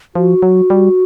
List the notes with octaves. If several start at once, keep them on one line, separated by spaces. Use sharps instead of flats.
F3 F#4
F#3
G3